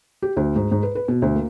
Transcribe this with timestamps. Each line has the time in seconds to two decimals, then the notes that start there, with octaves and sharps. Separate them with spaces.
0.22 G4
0.36 D2
0.56 G#2
0.72 G#2
0.83 B4
0.95 B4
1.08 B2
1.22 D2
1.36 A#3